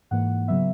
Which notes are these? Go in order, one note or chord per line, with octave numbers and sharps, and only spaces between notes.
G#2 E3 A#3 F#5
C#3 F#3 B3 E5